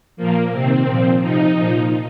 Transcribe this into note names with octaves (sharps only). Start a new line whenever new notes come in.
A#2 F3 A#3
C3 D#3 C4
A#2 F3
C3 F3 D#4
A#2 F3